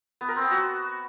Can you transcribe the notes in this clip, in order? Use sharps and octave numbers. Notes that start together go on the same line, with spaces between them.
B3
A#4
C4
B3
F#4